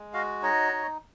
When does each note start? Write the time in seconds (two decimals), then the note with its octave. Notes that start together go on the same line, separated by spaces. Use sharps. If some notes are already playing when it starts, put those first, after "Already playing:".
Already playing: G#3
0.13 F#4 D#5 F5
0.43 D#4 C#5 D#5
0.72 D#4